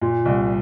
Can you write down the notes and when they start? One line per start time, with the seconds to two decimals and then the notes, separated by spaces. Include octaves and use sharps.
0.02 A#2
0.25 C2